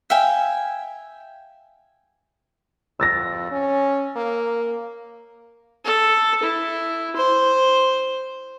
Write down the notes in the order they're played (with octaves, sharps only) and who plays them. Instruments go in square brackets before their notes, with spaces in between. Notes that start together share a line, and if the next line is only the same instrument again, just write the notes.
[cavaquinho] E5 F5 G5 G#5
[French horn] F2 [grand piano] E6 A6 A#6
[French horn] C#4
A#3
[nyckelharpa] A4
E4
C5